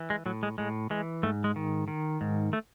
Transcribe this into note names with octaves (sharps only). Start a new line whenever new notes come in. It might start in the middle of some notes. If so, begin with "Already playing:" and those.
Already playing: E3
G#3
A2 F#3
G#3
A2 G#3
E3 G#3
G#2 A3
G#3
D#3
D#3
G#2
A3